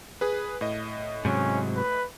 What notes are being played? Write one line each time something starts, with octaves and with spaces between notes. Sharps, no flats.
G#4 B4
A2 D#5
G#2 C3 F#3 C#4
B4